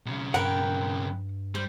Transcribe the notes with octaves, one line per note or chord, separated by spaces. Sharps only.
B1 C#3
G2 A#4 B4 F#5 G5
G3 C5